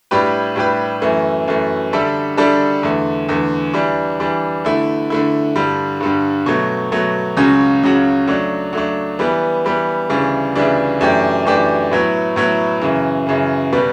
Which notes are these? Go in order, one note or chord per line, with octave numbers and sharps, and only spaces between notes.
A2 G3 D4 G4 B4
A2 G3 D4 G4 B4
F#2 E3 A3
F#2 E3 A3
D3 G3 D4 A4 E5
D3 G3 D4 A4 E5
E2 D3 A3
E2 D3 A3
E3 G3 D4
E3 G3 D4
D3 A3 E4
D3 A3 E4
G2 D3 G3
G2 D3 G3
B2 F#3 A3
B2 F#3 A3
C#2 C#3 F#3 C#4 F#4
C#2 C#3 F#3 C#4 F#4
F#3 A3 D4
F#3 A3 D4
E3 G3 B3
E3 G3 B3
D2 C#3 E3 G3 D4
D2 C#3 E3 G3 D4
F#2 E3 A3 D4 G4
F#2 E3 A3 D4 G4
A2 F#3 B3 E4
A2 F#3 B3 E4
F#2 C#3 E3
F#2 C#3 E3
B2 G3 B3